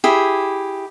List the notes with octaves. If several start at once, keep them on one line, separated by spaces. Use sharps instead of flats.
E4 G4 G#4